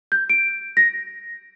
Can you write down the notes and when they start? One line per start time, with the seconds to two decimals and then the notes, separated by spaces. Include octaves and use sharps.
0.12 G6
0.30 D7
0.77 A#6